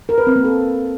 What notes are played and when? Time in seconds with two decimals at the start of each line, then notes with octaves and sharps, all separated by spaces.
0.09 A#4
0.18 B4
0.27 C4
0.36 A#3
0.45 A4